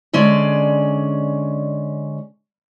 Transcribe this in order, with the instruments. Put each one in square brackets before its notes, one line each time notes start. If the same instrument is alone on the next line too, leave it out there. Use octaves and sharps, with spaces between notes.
[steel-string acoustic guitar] D3 G#3 C#4 D5